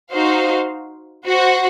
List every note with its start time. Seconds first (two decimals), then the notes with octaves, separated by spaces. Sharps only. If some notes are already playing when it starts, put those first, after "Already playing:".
0.11 D#4 F#4 C5 F5
1.26 F#4 C5 F#5